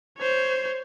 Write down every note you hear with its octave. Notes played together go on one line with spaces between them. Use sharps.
C5 C#5